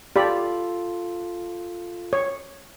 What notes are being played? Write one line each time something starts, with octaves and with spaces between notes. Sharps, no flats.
F4 G4 A4 D5 B5
C#5